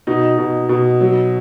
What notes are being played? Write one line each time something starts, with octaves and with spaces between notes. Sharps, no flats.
B2 D#4
B2
B2
F#3